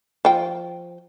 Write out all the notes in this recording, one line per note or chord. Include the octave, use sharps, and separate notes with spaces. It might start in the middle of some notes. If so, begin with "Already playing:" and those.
F3 G5